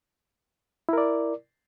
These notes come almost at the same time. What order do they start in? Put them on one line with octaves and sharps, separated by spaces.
E4 A#4 D5